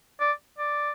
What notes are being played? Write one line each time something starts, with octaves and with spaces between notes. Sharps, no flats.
D5
D5